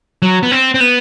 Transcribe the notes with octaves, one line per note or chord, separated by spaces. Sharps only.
F#3
B3
C4
C4
B3